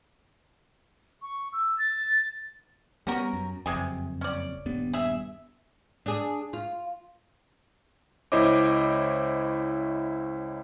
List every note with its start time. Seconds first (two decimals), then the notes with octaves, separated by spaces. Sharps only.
1.22 C#6
1.53 E6
1.79 A6
3.07 G3 B3 C#4 F#4 A#4
3.33 F#2
3.66 F#1 F2 C3 G#4 G#5
4.21 C#4 D5
4.66 D#1 G2 B3
4.93 G#4 E5
6.06 D4 G#4
6.53 F4
8.32 C#2 E4 C5 C#5 D#5 D6